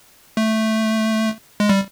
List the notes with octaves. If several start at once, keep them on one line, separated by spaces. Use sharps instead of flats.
A3
G#3
G3